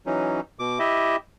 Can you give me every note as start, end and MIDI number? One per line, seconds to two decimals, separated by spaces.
0.06 0.40 52
0.06 0.40 54
0.06 0.40 61
0.06 0.40 63
0.59 0.79 47
0.59 0.79 86
0.79 1.16 64
0.79 1.16 67
0.79 1.16 75
0.79 1.16 76